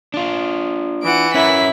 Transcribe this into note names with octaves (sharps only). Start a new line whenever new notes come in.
D4 F4
E3 F#5 D7
C#4 E4 A#4 B6